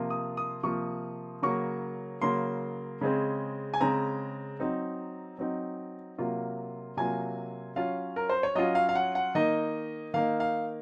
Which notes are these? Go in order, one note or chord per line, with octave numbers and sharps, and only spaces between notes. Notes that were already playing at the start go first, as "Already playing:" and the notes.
Already playing: C3 F3 A#3 F4
D#6
D#6
C3 F3 A#3 F4 C#6
C#3 F#3 A#3 C#6
C#3 F#3 A#3 C6
C#3 G#3 C4
G#5
C#3 G#3 C4 A#5
F#3 C4 D#4
F#3 C4 D#4
C3 F#3 A#3 F4
C3 F#3 A#3 F4 G#5
F#3 C#4 F4 F5
A#4
C5
C#5
F#3 C#4 F4 D#5
F5
F5
F#5
F#5
D#3 A#3 D#4 D#5
D#3 A#3 D#4 F5
F5